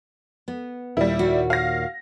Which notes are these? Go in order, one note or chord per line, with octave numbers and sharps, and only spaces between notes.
B3
D#2 A#2 G3 E4
F#4
F5 A#6